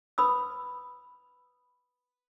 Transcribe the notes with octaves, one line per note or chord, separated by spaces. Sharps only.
B4 B5 D#6 E6